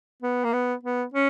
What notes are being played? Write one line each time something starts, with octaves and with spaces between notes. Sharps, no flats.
B3
A#3
B3
B3
C#4